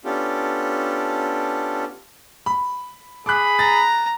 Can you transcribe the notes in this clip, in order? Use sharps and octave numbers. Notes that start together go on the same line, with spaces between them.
B3 C#4 D4 F4 G4 A4
B5
G#4 B5 D6 F#6
A#5 A6